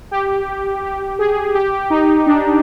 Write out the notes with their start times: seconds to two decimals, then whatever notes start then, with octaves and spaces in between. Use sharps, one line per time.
0.11 G4
0.83 G4
1.19 G#4
1.55 G4
1.72 G4
1.90 D#4
2.27 D4